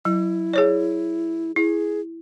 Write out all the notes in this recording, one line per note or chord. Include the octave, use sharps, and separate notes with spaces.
F#3 E4
G#4 C#5 D5
E4 G#4